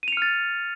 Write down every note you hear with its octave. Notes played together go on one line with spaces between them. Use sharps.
F6 A6 C#7 D#7 F7